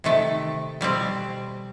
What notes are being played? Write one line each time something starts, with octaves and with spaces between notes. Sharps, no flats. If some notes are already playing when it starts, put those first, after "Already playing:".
C3 D#3 A3
B2 G3 C4